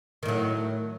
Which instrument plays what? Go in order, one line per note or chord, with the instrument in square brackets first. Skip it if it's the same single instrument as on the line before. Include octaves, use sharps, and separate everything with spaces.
[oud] D#3
A2
F#3